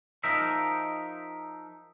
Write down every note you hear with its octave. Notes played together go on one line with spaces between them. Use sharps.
F3 D#4 A#4 E5